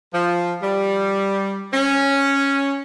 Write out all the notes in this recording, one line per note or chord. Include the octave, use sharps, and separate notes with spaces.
F3
G3
C#4